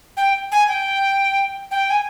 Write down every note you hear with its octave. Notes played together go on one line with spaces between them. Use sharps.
G5
G#5
G5
G5
G#5